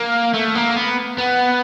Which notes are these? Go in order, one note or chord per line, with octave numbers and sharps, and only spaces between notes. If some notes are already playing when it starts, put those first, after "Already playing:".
Already playing: A#3
A3
A#3
B3
B3